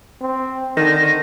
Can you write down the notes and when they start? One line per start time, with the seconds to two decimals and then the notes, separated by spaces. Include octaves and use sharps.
0.21 C4
0.77 D3 D#3 A#6